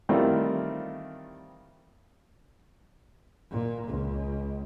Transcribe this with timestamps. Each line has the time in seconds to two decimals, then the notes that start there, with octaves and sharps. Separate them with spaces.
0.09 D#3 E3 G3 A3 C4 F4
3.51 A#2
3.86 C#2